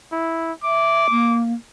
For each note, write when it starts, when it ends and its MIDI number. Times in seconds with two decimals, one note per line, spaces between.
0.12 0.52 64
0.64 1.07 76
0.64 1.39 86
1.10 1.53 58